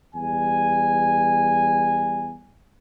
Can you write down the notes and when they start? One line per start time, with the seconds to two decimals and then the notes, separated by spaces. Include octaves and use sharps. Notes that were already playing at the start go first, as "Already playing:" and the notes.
0.15 E2 G3 G#5